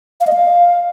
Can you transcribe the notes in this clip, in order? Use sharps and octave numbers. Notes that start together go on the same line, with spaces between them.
F5
D#5
F5